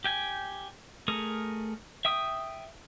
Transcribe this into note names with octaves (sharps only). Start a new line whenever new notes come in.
G4 G5 G#5
A3 G#4 A#4
E5 G5 D#6